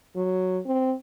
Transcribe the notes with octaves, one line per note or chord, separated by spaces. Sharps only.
F#3
C4